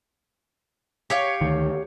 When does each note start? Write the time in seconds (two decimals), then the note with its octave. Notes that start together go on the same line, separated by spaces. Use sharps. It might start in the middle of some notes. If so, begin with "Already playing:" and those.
1.10 G4 C#5 F5
1.41 D2 D#3